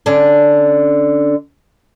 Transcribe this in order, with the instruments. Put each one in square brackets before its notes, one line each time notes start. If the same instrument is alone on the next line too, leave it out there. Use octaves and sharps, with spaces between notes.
[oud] D3 C#4 D4